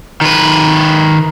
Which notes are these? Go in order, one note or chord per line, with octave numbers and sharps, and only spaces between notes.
D#3 B4